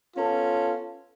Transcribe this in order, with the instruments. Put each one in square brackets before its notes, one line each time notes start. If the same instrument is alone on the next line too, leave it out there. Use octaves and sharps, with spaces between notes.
[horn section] B3 C#4 F4 A4